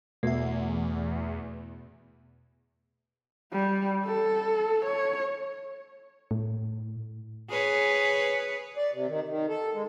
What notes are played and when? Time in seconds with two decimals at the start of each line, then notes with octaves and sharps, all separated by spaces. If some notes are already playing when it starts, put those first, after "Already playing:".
0.23 E2 B2 A3 E5
3.52 G3
4.06 A4
4.86 C#5
6.31 A2
7.50 G#4 B4 C#5
8.77 D5
8.93 C3
9.07 D#3
9.28 D#3
9.49 A4
9.74 G#3